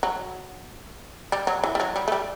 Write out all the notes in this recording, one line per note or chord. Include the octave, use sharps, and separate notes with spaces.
F#3
G3
F#3
E3
G3
F#3
G3
A3
G3